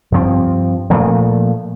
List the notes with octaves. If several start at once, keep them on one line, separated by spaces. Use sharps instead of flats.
G2 F3 C4
A#2 F3 A3